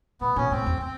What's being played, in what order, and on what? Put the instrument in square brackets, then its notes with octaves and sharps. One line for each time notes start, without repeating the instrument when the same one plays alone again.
[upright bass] A#2 [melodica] B3
[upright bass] A#2 [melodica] C#4
[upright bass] A2 [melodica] C4
[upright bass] E2
[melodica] C4